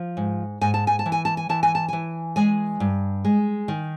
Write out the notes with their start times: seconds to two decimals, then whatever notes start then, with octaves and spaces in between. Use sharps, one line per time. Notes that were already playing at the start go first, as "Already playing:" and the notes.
Already playing: F3
0.17 G#2
0.61 G#2 G#5
0.74 A5
0.87 G#5
0.99 A5
1.06 E3
1.12 G#5
1.25 A5
1.37 G#5
1.49 E3 A5
1.63 G#5
1.75 A5
1.88 E3 G#5
2.36 G#3 G#5
2.80 G2
3.25 G#3
3.68 D#3